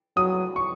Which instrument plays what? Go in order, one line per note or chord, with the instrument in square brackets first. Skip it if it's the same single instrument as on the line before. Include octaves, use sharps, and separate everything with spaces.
[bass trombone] F#3 [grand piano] D#6
[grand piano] C#6